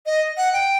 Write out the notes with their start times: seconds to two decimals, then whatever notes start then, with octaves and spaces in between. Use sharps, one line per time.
0.06 D#5
0.37 F#5
0.53 G5